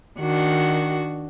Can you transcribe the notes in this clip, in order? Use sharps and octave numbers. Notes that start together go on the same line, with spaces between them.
D#3 D4 F#4